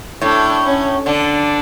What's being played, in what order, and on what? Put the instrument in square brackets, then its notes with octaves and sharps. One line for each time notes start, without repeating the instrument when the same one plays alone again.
[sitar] A2 [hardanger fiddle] D4
[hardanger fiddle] C#4
[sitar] D3 [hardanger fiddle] D4